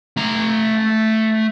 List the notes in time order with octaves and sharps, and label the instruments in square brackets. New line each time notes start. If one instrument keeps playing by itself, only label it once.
[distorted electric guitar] A3 A#5